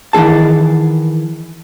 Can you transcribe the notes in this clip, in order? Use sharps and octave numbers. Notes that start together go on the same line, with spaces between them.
D#3 E3 C4 G#4 A5